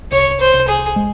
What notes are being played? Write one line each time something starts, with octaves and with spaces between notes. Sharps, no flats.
C2 C#5
C5
C2
G#4
G#3